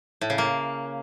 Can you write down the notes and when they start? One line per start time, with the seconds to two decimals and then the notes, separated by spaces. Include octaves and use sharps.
0.21 A2
0.30 C#3
0.38 A#3